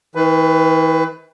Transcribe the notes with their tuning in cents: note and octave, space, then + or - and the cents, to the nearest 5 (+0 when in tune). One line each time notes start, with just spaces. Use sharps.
E3 -45 B4 +20